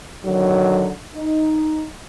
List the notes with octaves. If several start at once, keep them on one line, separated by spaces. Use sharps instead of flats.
D3 D#3 F#3
D#4